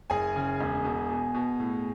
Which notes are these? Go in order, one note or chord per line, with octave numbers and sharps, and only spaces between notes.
F#1 G#4 G#5
C#3
E1
B2
B2
B2
A2